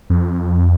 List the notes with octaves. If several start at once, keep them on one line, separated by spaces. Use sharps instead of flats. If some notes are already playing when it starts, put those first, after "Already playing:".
F2